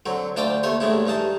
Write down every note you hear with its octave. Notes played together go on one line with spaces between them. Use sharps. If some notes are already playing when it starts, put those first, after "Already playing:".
D3 F#3 C4
D2 D4 F4 C5 D5 G5
D#2 A3 C5 C#5 C6
A1 A2 G#3 D4 E4
G2 E3 D#4 A5